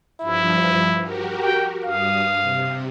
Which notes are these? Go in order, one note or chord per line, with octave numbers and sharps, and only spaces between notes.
G2 F3 E4
F#4 G4 A#4
G5
G2 F5 D#6
C3